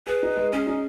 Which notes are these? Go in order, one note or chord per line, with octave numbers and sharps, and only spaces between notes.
G#4 B4
D#4
G#3
C#4 G#4
D#4